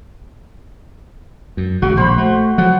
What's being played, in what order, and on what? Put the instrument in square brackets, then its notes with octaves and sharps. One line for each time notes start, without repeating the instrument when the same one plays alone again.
[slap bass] F#2
[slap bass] G#1 C#3 [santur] F#4
[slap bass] A#1 [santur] C5 B5
[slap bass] A3
[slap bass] F3 F#3 [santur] F#5